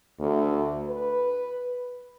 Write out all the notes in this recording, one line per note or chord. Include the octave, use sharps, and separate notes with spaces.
D2
B4